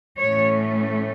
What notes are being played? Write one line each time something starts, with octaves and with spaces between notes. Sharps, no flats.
A2 E3 A3 C#4 C#5